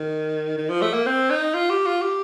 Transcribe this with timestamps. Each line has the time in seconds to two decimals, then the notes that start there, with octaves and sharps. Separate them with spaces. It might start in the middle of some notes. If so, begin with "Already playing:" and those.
Already playing: D#3
0.58 D#3
0.69 F3
0.82 A3
0.94 A#3
1.06 C4
1.30 D#4
1.54 F4
1.70 G4
1.86 F4
2.01 G4